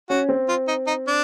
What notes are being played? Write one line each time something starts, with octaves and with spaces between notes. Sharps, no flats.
C#4 F#4
C4
F4
D#4
D#4
D4